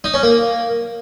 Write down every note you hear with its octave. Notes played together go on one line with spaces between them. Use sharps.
D#4
C#4
A#3